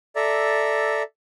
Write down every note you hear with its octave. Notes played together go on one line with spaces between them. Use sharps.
A4 D5 E5 A#5